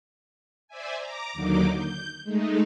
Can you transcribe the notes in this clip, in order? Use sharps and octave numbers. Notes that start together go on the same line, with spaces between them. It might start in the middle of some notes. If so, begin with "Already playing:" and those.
C5 D5 E5 G#5
A#5 D6
D#2 D3 F#3 A#3 D#4 D6
G6
G#3 A3 D#4